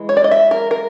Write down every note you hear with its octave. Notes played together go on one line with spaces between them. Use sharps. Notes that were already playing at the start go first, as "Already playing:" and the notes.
Already playing: E3 G#3
C#5
D5
D#5
E5
A#4
A#4